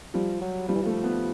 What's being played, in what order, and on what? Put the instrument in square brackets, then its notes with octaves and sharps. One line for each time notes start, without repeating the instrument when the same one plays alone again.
[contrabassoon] F3 [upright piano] G3
[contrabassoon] F#3
[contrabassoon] F3 [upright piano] G3
[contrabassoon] E3
[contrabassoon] F3 [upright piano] A3
[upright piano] B3